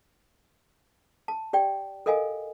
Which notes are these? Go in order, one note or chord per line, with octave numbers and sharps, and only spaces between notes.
A5
G4 D5 G5
A4 A#4 D#5 F5 G#5